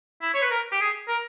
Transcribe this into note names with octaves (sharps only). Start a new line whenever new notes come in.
E4
C#5
B4
A#4
G4
G#4
A#4